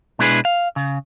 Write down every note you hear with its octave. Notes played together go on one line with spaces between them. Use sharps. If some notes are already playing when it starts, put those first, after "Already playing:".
B2 G#3 D4 E4 G#4 B4
F5
C#3